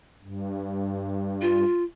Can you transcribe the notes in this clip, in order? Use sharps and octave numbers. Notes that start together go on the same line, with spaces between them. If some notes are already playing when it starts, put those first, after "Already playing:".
G2
F4